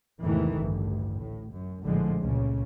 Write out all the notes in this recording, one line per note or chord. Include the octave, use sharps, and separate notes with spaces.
E2 G#2 C3 D#3 E3 A3
A1 D2 G2
A2
F#2
A#1 A2 D3 F3 G#3
C#2 A#2 C#3 C#4